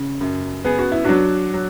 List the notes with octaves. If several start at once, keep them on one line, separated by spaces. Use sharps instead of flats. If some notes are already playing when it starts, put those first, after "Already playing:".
Already playing: C#3
F#2
B3 G#4
F#4
E4
F#3 D4 F#4
F#3